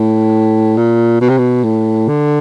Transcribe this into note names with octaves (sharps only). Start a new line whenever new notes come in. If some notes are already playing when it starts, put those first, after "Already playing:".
Already playing: A2
A#2
B2
C3
B2
A2
D3